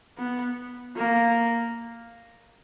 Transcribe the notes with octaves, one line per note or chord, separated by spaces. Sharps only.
B3
A#3